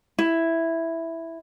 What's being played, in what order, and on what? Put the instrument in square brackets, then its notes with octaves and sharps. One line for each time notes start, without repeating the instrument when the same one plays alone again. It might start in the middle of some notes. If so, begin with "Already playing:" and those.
[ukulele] E4